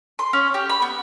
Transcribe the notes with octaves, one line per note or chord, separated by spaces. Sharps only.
C6
C#4
G4
B5
B3